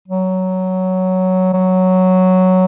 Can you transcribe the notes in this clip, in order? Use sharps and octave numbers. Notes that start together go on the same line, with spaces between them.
F#3
F#3